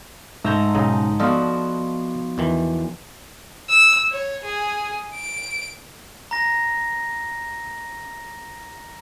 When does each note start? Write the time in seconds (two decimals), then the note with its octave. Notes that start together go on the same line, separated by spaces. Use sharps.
0.45 G#2 A3 A5 A#5 E6 G6
0.75 B1 C#3 D#4
1.20 F3 B3 F#4 A4 D5 D#5 F5
2.38 E2 D#3 E3
3.70 E6
4.11 C#5
4.44 G#4
5.14 D7
6.31 A#5 A#6